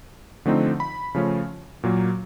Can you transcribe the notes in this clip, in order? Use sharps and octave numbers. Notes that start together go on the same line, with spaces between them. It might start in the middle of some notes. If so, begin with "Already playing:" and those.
D3 F3 A3 C4 D#4
B5
C#3 F3 A3 C#4
A#2 F#3 A#3